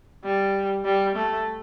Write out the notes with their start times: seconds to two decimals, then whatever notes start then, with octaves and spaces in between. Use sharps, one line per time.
0.24 G3
0.85 G3
1.15 A3